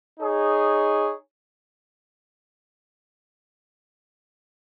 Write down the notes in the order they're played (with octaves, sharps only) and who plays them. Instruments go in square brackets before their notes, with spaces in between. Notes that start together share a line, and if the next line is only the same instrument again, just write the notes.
[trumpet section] D#4 G#4 C#5